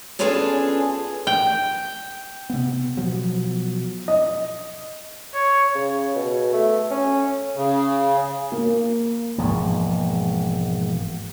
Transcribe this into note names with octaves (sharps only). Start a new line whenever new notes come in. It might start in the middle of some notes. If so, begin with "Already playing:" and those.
B3 C#4 D4 F4 G#4 A4
G5
C3 B3
B2 F3 F#3
D#5
C#5
C#3
B2
A3
C#4
C#3
A#3
E1 G#2 F3 A#3